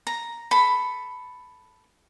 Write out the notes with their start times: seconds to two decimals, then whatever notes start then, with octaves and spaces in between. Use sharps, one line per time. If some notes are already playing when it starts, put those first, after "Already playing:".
0.07 A#5
0.51 A4 B5